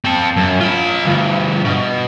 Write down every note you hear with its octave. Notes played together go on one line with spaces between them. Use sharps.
C4 A4
F#2
F4 B5
D2 G2
B2